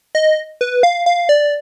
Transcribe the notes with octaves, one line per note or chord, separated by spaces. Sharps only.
D#5
B4
F5
F5
D5